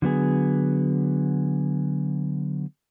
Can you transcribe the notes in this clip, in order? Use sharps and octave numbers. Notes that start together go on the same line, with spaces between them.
D3 F#3 B3 G#4